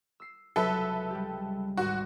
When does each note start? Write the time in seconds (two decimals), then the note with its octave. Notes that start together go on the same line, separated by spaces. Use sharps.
0.20 E6 C7
0.56 C#2 C3 F#3 A4 B4 E5
1.10 G3 G4
1.77 G#1 F#4 D#7